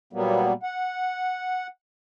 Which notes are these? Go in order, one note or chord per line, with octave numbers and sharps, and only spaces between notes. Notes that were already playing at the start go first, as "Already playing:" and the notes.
A#2 F#3 G3 A#3 B3
F#5